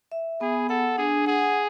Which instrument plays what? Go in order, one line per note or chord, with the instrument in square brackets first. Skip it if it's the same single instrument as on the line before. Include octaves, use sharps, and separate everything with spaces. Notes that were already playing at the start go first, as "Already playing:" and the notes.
[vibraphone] E5
[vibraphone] B3 [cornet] G#4
[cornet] A4 [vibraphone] F#5
[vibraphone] D4 [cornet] G#4
[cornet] G#4 [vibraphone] F#5